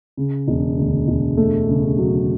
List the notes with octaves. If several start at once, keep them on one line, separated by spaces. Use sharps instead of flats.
C#3
E1
D2
E1
A3
C#3
F#3